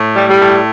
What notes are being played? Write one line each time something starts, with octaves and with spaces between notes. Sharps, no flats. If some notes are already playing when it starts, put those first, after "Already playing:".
Already playing: A2
G3
G3
A2